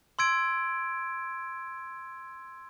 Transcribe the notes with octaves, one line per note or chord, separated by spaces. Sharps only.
C6 E6 G#6 D7